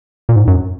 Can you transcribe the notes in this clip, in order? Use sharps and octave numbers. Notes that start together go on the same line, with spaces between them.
A#2
G#2
F#2